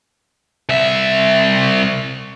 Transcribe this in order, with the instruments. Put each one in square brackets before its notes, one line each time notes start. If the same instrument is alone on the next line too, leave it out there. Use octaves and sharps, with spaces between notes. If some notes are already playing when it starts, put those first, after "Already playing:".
[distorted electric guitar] C2 E5